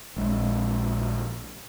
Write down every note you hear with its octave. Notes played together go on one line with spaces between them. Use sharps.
A#1 G#3